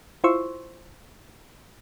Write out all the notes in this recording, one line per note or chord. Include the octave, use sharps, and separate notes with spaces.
E4 F4 C5 C6 C#6 E6